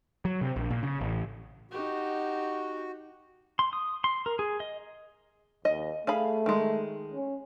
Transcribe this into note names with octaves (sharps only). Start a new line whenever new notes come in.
F#3
C3
A#1
A#2
C#3
A1
D#4 F#4 G4
C6
D#6
C6
A#4
G#4
D#5
D#2 D#5
A3 G#4 F5 B5
D#3 G#3
C#4